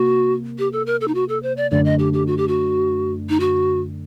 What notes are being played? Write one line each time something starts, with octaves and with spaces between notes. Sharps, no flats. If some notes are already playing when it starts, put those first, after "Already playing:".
Already playing: C3 A#3 F#4
G4
A4
A#4
A4
D#4
F#4
A4
C5
D5
F#2 D3 A3 D4 D5
D#5
G4
G4
F#4
G4
F#4
D#4
F#4